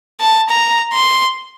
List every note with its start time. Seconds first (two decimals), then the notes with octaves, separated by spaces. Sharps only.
0.20 A5
0.49 A#5
0.93 C6